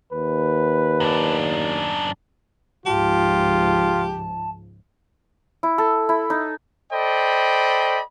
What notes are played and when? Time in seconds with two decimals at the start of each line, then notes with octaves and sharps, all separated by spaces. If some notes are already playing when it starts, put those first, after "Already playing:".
0.13 D#2 B4
1.00 F#2 D4
2.86 C#2 G#2 F3 F4 G4 A5
5.63 E4
5.78 A4
6.09 E4
6.30 D#4
6.92 A4 C5 D5 D#5 G5 B5